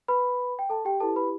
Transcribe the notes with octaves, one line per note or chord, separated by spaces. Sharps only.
B4 B5
G5
A4 A5
G4 G5
E4 G4 A4 B4 A5
B4 B5